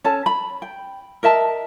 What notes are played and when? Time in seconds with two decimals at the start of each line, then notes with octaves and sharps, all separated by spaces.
0.04 C#4 A4 A5
0.26 B5
0.62 G5
1.23 A#4 D#5 E5 A5